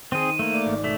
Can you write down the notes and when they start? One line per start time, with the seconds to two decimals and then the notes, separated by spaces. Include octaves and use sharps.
0.12 D#3 C4 G#4 C5 D#7
0.39 A3 A#3
0.53 D5 D6
0.66 G#1
0.84 B2 A3 C#4 B6